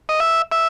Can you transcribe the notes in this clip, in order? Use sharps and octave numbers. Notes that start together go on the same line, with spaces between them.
D#5
E5
E5